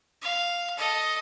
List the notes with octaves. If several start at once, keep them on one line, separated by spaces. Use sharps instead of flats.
F5
A4 D#5